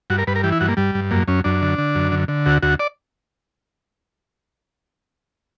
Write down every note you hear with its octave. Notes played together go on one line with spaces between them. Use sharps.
G2 F#4
A#4
G2 B4
A#4
E3 G4
E4
G2 F#4
A#3
G2 G3
G2
F#2 A#3
F#2 C#4
F#2 D4
D3
D3
F#2
D3
D3
D2 F#4
D2 F#4
D5